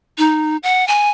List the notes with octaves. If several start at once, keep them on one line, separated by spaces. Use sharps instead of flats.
D#4
F#5
G#5